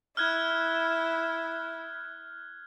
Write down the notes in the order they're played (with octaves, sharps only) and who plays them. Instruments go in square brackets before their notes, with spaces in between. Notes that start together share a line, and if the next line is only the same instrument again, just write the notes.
[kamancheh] E4 [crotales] F6 F#6 G#6